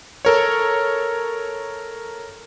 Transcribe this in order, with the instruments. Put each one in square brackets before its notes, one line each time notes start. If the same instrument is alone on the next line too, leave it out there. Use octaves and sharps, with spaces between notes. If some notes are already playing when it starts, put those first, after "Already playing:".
[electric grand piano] A4 A#4 C#5